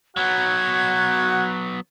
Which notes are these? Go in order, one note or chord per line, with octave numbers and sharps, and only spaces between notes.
F#3 B3 F#4 F#5 G#6